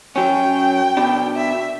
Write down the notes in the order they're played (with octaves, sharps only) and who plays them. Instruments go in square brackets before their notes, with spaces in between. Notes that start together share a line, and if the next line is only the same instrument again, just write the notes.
[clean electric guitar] F#2 F#3 C#4 [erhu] G5
[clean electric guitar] B2 D4
[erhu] E5